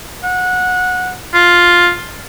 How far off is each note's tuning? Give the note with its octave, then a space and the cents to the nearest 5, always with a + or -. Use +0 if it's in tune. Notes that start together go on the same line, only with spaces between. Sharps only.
F#5 -20
F4 +5